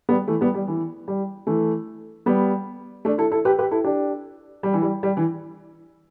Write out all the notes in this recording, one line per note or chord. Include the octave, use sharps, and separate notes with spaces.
G3 B3
E3 A3
G3 B3
G3
E3
G3
E3 A3
G3 B3
A3 D4
E4 A4
E4 A4
G4 B4
G4 B4
E4 A4
D4 G4
G3
E3
G3
G3
E3